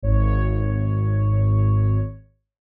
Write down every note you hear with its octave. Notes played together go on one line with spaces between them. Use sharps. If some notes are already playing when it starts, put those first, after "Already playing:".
G#1 C#5